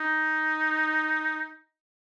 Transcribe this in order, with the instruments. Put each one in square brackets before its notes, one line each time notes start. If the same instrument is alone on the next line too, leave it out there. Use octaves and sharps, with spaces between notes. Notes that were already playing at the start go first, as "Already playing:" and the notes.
Already playing: [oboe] D#4